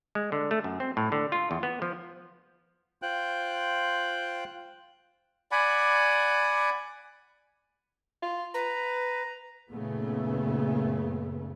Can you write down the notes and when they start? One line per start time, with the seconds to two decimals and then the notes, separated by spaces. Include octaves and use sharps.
0.15 G#3
0.32 D3
0.51 A3
0.64 F#2
0.80 C4
0.97 A2
1.12 D3
1.32 F4
1.51 E2
1.63 B3
1.82 F3
3.02 F4 C5 G5 F#6
5.52 D5 F#5 G#5 B5
8.22 F4
8.54 B4 A#5
9.71 F#1 A#2 C#3 A3 B3